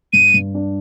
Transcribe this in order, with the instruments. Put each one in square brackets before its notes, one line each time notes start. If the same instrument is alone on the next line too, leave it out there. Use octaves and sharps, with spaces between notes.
[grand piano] G2 [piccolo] D#7
[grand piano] G2
D4